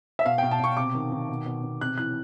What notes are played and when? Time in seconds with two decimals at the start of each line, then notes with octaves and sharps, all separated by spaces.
0.19 E5
0.25 B2 F5
0.38 B2 G5
0.51 A5
0.60 B2 C#6
0.77 C3 D6
0.95 D#3
1.12 D#3
1.29 B2
1.46 B2
1.63 B2
1.81 C3 F#6
1.98 E3 F#6